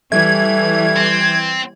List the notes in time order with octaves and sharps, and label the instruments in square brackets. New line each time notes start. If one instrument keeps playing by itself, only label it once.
[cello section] E3 G3 [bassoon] A3 [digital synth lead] G#6
[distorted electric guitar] C4